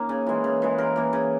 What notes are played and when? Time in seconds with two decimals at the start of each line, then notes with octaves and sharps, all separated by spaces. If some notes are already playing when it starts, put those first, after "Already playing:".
Already playing: A#3 C#4 D#4
0.09 C#3
0.27 E3 G#3
0.44 C#3
0.62 E3 G#3
0.78 C#3 A#4
0.96 E3 A#3
1.13 C#3